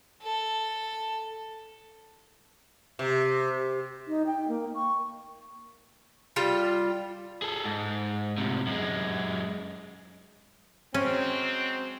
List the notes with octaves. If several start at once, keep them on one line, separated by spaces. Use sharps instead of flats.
A4
C3
D#4
G5
A#3
C#6
G3 F4 G5
G#4 A4
G#2
A2 C3
F#2 G#3
F#3 G#3 C4 C#4